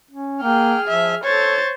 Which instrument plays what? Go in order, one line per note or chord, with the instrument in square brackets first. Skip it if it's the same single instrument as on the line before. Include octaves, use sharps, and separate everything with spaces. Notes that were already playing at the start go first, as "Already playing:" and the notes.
[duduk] C#4
[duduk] A#3 [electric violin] G#4 F6 [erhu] G5
[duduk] F3 [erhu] E5
[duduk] A4 [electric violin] C5 A6 [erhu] C#5